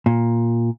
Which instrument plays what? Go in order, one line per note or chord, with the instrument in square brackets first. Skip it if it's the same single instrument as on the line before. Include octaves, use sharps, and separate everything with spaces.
[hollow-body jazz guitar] A#2